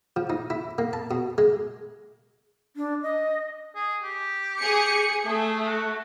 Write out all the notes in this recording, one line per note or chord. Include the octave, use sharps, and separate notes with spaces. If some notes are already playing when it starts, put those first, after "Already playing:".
F3
D#4
E4
A#3
A5
B2
G#3
D4
D#5
G#4
G4
G#4 C#7
A3 G#4
F#4